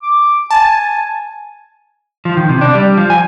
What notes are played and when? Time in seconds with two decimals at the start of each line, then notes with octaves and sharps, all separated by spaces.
0.02 D6
0.51 G#5 A5
2.25 F3
2.37 D#3
2.49 C3
2.61 D4
2.75 G3
2.97 F3
3.10 G#5